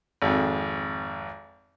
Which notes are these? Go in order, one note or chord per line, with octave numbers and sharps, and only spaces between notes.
G#1 F2